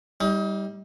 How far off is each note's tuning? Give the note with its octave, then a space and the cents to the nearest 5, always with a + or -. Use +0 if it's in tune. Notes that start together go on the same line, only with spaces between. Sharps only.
G3 +0 D#4 +35